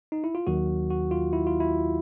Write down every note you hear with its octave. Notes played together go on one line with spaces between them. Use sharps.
D#4
E4
F4
D#2 D#3 F#3 F#4
F#4
F4
E4
F4
E4